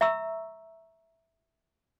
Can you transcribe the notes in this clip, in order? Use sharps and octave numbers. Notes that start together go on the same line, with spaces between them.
E5 A#5 C#6 E6